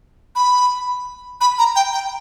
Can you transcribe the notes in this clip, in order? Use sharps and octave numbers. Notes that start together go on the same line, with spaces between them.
B5
B5
A#5
G5
G5